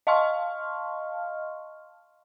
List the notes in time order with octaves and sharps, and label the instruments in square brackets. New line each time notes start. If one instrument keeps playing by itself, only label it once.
[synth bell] D#5 F5 A5 C6 C#6 F6